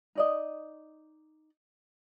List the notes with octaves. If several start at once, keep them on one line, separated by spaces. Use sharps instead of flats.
D#4 D5 D#5